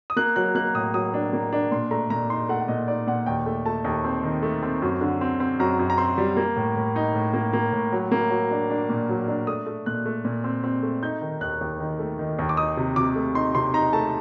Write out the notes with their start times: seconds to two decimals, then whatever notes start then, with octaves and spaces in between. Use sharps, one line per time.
0.10 D#6
0.16 A#3 F#6
0.36 F#3 F#6
0.55 A#3 F#6
0.74 A2 D#6
0.94 F#3 D#6
1.14 D4
1.33 A#3
1.53 D4
1.71 A#2 C6
1.91 A3 A#5
2.10 A#2 A#5
2.30 D#4 C6
2.49 A3 F#5
2.61 F#5
2.68 A#2 D#5
2.88 D#4 D5
3.07 A#2 F#5
3.26 D#2 G5
3.46 A3
3.66 A3 A5
3.85 D#2
4.04 C4
4.24 D#3
4.43 A3
4.63 C4
4.82 F#2
5.01 D3
5.21 C4
5.40 C4
5.60 F#2 A#5
5.79 F#2
5.90 A#5
5.98 C4 C6
6.18 G3
6.37 A#3
6.56 A2
6.76 A2
6.96 D#4
7.15 A2
7.34 A#3
7.53 A#3
7.72 A2
7.92 F#3
8.12 A#3
8.30 F#3
8.51 D4
8.70 D4
8.89 A#2
9.09 F#3
9.28 D4
9.47 A3 D#6
9.66 A3
9.86 A#2 F#6
10.06 A3
10.25 A#2
10.44 C4
10.64 C4
10.83 A3
11.03 D#4 G6
11.22 D#3
11.41 D#2 F#6
11.61 D#2
11.80 D#3
11.99 A3
12.19 D#3
12.39 D#2
12.49 D6
12.57 D#4 D#6
12.77 C3
12.96 C3 D6
13.16 A3
13.35 D#4 C6
13.55 C3 C6
13.74 D#4 A#5
13.93 A3 A5